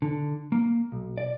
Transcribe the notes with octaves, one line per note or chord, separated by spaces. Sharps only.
D3
A#3
B1
D5